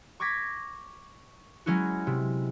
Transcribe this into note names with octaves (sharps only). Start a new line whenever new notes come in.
C#6 D6 G#6 A#6 B6
F#3 G#3 C#4 E4 F#4
C3